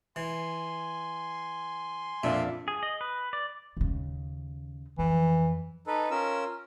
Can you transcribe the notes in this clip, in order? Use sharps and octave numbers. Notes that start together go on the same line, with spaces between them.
E3 G#5 C6
F2 A#2 D4 E5 F5
G#4
D#5
B4
D5
D#2 C#3
F2 E3
D#4 A4 B4
C#4 F4 A#4 E6